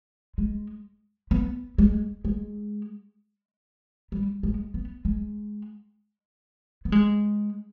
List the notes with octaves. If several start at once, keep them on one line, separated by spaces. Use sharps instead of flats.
G#3
B3
G#3
G#3
G3
G#3
B3
G#3
B3
G#3